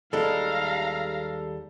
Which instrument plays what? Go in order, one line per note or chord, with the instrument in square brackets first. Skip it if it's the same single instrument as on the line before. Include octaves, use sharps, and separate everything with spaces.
[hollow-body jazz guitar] D#2 G3 G#3 [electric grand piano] A4 [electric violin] F5 A#5